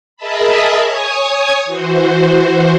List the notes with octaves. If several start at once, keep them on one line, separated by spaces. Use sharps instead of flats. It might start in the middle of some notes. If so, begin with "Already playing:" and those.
G#4 A#4 D#5 E5 A5 B5
C#5 G#5 C#6 D#6
E3 F#4 C5